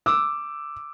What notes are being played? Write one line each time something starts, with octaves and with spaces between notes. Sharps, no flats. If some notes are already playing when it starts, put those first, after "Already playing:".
D6 E6